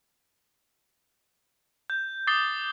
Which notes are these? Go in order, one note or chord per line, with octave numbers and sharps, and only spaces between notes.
G6
D6 D#6 A6 C7 G7